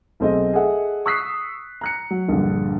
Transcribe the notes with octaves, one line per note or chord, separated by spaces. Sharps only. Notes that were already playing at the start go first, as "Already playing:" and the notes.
B1 A3 C4 G#4 D#5
G#4 A4 D#5 E5 F#5
C#6 D#6 E6 F#6 B6 C7
A#5 F#6 C#7
F#3
A#1 G2 D3